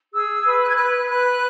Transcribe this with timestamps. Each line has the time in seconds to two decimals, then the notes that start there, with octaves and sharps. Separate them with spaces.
0.14 G#4 E6
0.46 B4
0.62 F#6
0.69 G#6
0.77 B4 F#6
1.09 B4 F#6